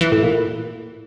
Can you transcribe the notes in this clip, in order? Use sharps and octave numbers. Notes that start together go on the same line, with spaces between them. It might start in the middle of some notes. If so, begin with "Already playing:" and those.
E3
A2
A#2